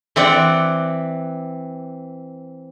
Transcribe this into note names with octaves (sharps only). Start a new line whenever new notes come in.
E3 C4 D5 F#5